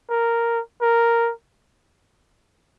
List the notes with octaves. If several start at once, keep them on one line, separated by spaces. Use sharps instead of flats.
A#4
A#4